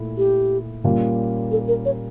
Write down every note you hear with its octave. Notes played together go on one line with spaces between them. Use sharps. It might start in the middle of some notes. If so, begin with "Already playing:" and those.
Already playing: A#2 A3 E4
G4
A#2 G3 A#3 C#4 F4
A4
A#4
C#5